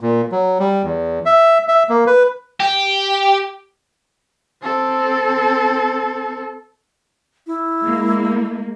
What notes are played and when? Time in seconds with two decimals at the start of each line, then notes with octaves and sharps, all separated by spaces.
0.01 A#2
0.32 F#3
0.60 G3
0.83 E2
1.26 E5
1.68 E5
1.89 A#3
2.07 B4
2.60 G4
4.63 C4 A4
7.47 E4
7.80 G#3 A#3